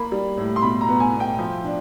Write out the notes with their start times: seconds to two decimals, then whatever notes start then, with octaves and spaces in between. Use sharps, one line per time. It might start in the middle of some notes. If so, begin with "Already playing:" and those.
Already playing: A#3 B5
0.12 G3
0.38 A2
0.56 C6
0.62 B2 B5
0.81 A#5
0.88 B3
1.00 G#5
1.13 B2
1.20 G5
1.39 F3
1.64 D4